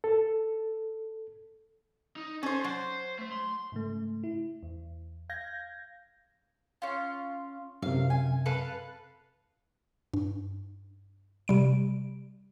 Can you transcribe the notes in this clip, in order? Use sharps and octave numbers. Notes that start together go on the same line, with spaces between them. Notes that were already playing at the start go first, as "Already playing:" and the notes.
A4
D#4
C#4 A4 C5
F#3 C5
A3
C6
G#2 C#3 A3
E4
E2
F5 G6 G#6 A#6
C#4 F4
F#2 C3 F5
G#5
A4 B4 F5
G2
C3 G3 D7